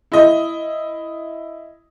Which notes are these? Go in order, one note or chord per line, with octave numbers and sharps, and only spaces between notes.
E4 D#5